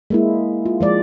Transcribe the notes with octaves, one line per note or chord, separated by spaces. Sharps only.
G#3 A#3 E4
F4
F3 G#3 D5